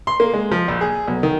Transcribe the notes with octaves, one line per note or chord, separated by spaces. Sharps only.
C6
A#3
G#3
F3
A#1
G#4
B1
D#3